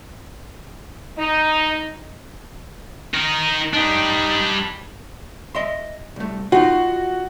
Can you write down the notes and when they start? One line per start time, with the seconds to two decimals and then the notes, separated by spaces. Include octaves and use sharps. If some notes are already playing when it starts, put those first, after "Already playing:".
1.18 D#4
3.14 D#4 A#4
3.73 G3 D4 D#4
5.55 D#5 E5 C6
6.16 C2 A3
6.52 D#4 F4 F#4